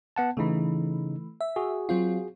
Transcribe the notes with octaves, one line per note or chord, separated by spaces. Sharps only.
B3 F#5 A5
C#3 E3 A3 D#4
E5
F#4 G#4
F#3 C4 F4